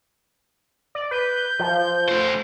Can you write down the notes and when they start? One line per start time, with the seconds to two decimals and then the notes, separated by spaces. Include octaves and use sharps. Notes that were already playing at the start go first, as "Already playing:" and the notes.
0.95 D5
1.11 B4 G6
1.59 F3
2.08 A3 C5